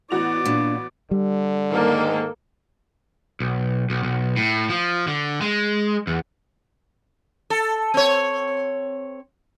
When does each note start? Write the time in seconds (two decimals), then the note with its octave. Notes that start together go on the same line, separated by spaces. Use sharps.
0.11 A1 B3 E4 F#4 D5 F7
0.46 A#2 D4
1.11 D3 G3
1.71 G#2 D#3 A#3 A4
3.40 B1
3.90 B1
4.03 B1
4.37 A2
4.70 F3
5.07 D3
5.41 G#3
6.07 E2
7.50 A4
7.94 C4 C#5